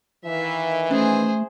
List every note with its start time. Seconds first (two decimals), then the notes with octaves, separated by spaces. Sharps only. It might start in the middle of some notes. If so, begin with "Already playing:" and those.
0.25 D#3 E3 E5 F5
0.91 A3 C#4 G#4 C5